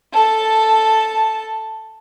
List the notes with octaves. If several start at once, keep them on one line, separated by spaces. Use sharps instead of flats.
A4 A5